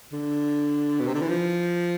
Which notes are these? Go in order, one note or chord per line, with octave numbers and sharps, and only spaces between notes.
D3
B2
C3
D3
E3
F3